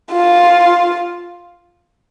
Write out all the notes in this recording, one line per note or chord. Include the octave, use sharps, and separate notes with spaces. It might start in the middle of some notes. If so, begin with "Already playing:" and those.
F4